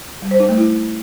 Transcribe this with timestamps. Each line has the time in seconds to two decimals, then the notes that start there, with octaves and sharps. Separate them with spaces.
0.22 G3
0.31 C5
0.40 D#4
0.49 A3
0.58 E4